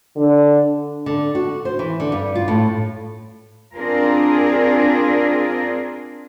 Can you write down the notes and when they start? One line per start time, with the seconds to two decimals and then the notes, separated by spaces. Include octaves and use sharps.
0.16 D3
1.06 D3
1.35 F#4
1.65 C5
1.79 E3
2.00 D3
2.12 G2
2.35 F4
2.48 A2
3.75 C4 D4 F4 G#4 A#4